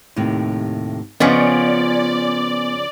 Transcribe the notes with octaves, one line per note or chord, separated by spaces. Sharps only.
D#2 A2 C3
C#3 F3 B3 C#4 F4 D5 D#5